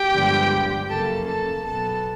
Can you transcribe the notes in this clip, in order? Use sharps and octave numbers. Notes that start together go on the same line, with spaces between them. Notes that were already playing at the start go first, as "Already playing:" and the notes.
Already playing: G4 G5
G2 D3 F3 G#3 B3
F#2 C#3 F3 A#3 A4 A5
A4 A5
B2 F#3 B3 A4 A5